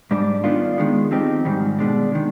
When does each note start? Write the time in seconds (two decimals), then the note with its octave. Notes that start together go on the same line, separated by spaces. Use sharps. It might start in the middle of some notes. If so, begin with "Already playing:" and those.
0.11 G#2 G3 D4
0.44 D#3 B3 D4 F4
0.78 D#3 G#3 B3
1.11 F3 C4 D#4 G4
1.45 G#2 D#3 G3
1.79 B2 G#3 D4
2.12 D#3 G#3